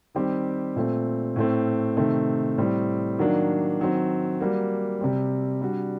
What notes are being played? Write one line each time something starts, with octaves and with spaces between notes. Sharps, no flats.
D#3 G3 C4 G4
A#2 A3 C4
A2 A3 C4
C3 D#3 A3 C4
A2 G3 C4
D#3 F#3 A#3 D4
D#3 F#3 C4
G3 A#3 F#4
C3 G3 C4
G3 D4 F#4